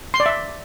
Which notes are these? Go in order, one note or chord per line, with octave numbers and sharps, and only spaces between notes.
C6
D5
E5